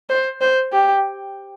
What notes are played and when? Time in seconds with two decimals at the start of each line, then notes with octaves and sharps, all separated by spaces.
0.10 C5
0.41 C5
0.72 G4